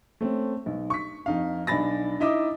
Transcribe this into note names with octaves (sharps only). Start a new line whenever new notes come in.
A3 C4 C#4
B1
C#6 B6
F2 D#4 F5
B1 D4 G#5 B5 A6 A#6
D#4 E4 D#5 E5 D6 D#6